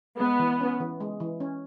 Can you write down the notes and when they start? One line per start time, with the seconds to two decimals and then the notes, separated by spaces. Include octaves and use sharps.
0.19 G#3 B3
0.39 E3
0.61 C#4
0.80 E3
1.00 G#3
1.20 E3
1.40 C#4